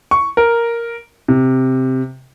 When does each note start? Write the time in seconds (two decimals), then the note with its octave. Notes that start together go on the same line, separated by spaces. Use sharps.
0.11 C#6
0.37 A#4
1.28 C3